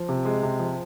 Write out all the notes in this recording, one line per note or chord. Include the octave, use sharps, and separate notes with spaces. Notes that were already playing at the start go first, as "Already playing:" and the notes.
Already playing: F3
C3
G#3
C3
F3